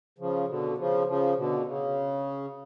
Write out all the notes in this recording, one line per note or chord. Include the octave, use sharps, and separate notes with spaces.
C#3 F3
B2 D3
C#3 F3
C#3 F3
B2 D3
C#3